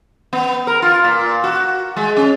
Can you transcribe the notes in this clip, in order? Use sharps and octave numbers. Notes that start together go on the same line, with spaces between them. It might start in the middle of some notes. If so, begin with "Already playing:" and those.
B3
A#4
F4
A#2
F#4
G#3
C#4